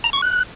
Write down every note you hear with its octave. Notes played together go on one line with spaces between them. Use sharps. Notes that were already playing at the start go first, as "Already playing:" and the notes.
A#5
C#6
F#6